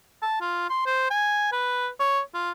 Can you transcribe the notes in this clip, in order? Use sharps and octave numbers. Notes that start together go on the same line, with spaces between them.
A5
F4
C6
C5
G#5
B4
C#5
F4